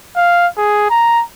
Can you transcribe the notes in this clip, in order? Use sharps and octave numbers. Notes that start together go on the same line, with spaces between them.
F5
G#4
A#5